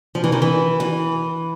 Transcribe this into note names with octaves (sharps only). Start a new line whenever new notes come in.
F3
E3
D#3
E3
E3